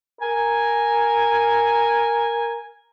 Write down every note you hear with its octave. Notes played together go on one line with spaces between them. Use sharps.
A#4 G#5